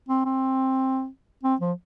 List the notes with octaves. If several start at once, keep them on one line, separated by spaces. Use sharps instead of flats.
C4
C4
C4
F3